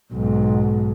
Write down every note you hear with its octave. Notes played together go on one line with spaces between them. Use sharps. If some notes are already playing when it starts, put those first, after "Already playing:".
B1 G#2